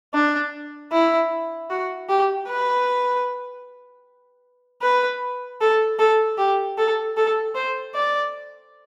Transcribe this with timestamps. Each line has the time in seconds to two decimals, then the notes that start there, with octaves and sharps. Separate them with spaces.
0.14 D4
0.92 E4
1.70 F#4
2.09 G4
2.49 B4
4.82 B4
5.61 A4
5.99 A4
6.38 G4
6.78 A4
7.17 A4
7.55 C5
7.95 D5